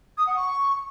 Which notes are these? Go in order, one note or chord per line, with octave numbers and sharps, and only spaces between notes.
D#6
F#5
C#6